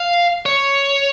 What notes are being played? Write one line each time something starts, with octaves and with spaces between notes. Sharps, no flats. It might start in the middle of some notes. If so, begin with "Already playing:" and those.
Already playing: F5
C#5